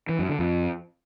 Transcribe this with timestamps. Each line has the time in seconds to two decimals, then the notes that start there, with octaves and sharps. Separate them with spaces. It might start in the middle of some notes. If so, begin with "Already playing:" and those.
0.09 E3
0.19 F#2
0.29 D3
0.39 F2